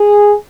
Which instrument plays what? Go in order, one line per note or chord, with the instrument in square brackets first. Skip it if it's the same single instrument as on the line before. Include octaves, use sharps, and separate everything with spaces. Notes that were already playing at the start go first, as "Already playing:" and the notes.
Already playing: [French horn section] G#4